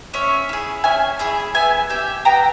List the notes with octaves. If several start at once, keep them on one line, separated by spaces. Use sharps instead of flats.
C#4 C#5 E5
E4 G#4
C#4 E5 G#5
E4 G#4 E5 G#5
B3 E5 G#5
G4 E5 G#5
B3 G5 A#5